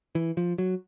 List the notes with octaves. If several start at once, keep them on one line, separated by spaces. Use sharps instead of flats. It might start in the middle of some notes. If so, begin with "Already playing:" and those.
E3
F3
F#3